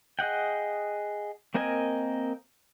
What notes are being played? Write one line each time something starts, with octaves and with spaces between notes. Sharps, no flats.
G#4 D#5 F#5 G5
A#3 C4 A#4 D#5 G#5